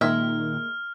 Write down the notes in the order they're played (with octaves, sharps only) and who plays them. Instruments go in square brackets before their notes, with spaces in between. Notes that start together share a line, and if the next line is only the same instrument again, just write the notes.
[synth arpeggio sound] A#2 D#3 [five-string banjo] G#3 G#4 E5 [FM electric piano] A#3 [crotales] F6